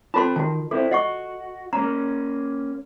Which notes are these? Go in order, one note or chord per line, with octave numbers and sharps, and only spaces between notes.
C4 F4 A4 A5 C6
D#3 F#4 A5
C4 E4 A4
F#4 D#5 F#5 C#6
A#3 C#4 A#5